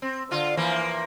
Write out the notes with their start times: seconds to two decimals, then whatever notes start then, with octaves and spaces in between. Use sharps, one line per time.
0.02 C4
0.31 D3 F4
0.57 E3 F3 A#3